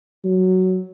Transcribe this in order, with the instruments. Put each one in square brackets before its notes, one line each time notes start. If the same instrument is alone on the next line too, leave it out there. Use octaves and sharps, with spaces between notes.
[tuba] F#3